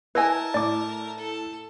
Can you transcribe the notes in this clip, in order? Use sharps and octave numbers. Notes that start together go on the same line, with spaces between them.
E4 A#4 B4 D#5 G#5 A5
A2 D5 D6
A4